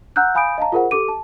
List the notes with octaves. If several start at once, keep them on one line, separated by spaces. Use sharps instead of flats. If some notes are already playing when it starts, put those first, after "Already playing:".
F#5 A#5 E6 F#6 G6
F5 G#5 B5 D#6 G6 D7
D#5 F5 A5 A#5
F4 G#4 A#4 C5 F#5
G4 A4 D6 D#7
A5